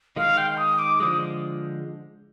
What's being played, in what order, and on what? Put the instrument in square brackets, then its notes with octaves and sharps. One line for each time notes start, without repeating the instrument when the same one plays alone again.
[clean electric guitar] D#3 G#3 D#4 [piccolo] F5
[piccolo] G5
D#6
D6
[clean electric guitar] D3 F3 G#3 [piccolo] D#6